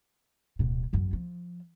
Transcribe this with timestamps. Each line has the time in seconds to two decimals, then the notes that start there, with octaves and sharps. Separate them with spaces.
0.59 D1 B2
0.93 G#1 F#2
1.13 F3